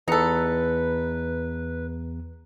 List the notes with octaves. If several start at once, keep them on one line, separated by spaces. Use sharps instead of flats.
E2 D#4 A4 B4 A#5 C#7